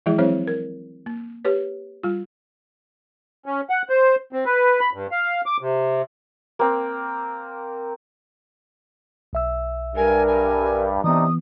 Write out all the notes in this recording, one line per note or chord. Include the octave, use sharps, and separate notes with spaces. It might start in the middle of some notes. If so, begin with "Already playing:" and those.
E3 F3 G#3 E4 G#4
F#3 C4 E4 G#4 C5 C#5
A#4
A#3
G4 B4 C#5
G3 F4
C#4
F#5
C5
C4
B4
B5
G2
F5
D6
C3
A#3 C4
B1 E5 E6
G2 A#4 G#5
G#5
C3 E3 B3 D4 D#4 D#6